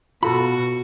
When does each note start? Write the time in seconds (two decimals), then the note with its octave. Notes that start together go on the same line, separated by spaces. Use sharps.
0.23 B2 F4 F#4 A4 B5